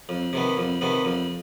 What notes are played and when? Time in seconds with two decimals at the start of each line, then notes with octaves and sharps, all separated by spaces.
0.09 F2
0.33 C3 D#3 B3
0.57 F2
0.81 C3 D#3 B3
1.05 F2